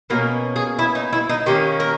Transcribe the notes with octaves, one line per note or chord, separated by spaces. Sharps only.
B2 A#3 C#4 A#4
G#4
E4
D#4
E4
D#4
D#3 A#3 C#4 G4
A#4